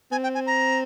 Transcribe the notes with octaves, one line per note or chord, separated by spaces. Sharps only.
C4 G#5
G5
G#5
A#5